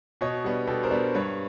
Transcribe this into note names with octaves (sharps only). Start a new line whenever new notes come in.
B2 C#5 D#5
G3 B3 D4
B2 G4 A4
A#4 C5
G3 B3 D4
G2 B4 C#5